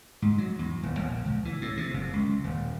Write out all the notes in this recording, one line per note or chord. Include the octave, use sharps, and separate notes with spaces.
G#2
F#3
E2
D#1
A#1
C#2
E3
A2
C3
F#1
C#2
D#1